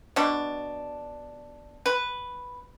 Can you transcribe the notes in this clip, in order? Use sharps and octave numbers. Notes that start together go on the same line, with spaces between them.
B2 D4
B4